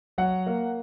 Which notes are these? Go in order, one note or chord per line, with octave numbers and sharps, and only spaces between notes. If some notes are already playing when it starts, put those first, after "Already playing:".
F#3 F#5
A#3